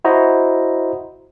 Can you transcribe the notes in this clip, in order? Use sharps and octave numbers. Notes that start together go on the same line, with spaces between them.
E4 F#4 C5 D#5 A#5